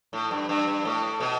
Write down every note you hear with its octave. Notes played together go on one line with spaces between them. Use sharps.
A2
G2
G2
G2
A2
B2